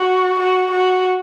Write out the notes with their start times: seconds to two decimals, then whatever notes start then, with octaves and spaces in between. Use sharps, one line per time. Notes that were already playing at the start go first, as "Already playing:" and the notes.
Already playing: F#4
0.40 F#4
0.71 F#4